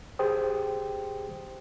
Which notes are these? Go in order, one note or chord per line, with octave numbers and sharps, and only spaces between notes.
G4 G#4 C5 G5 D#6